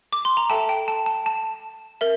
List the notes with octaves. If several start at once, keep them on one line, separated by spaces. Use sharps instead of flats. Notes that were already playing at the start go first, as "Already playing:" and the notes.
D6
C6
A#5
A4 E5 G5 A5
G5
A5
A5
A5
A#4 E5